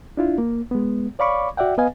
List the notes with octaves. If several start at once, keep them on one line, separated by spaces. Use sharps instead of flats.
D4 E4 F4
A#3
G#3 B3
C#5 D5 F5 B5 C#6 D6
F#4 D5 E5 F#5 G5
B3 B4 D#5 F5 G#5